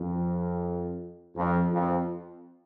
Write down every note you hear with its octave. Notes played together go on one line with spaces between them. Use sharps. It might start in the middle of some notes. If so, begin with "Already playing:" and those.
Already playing: F2
F2
F2